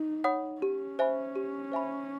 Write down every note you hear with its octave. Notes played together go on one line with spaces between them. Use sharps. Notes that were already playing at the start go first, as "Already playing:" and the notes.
Already playing: D#4
C#5 F#5 B5 D#6
C#4 G4
C5 E5 G#5 B5
G4
C5 E5 G#5 B5